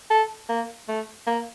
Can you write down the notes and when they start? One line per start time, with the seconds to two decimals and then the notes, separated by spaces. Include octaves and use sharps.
0.11 A4
0.49 A#3
0.88 A3
1.27 A#3